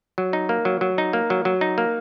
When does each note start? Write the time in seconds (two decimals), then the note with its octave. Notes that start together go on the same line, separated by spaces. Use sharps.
0.18 F#3
0.33 D#4
0.49 A#3
0.65 F#3
0.81 F#3
0.98 D#4
1.13 A#3
1.30 F#3
1.45 F#3
1.61 D#4
1.78 A#3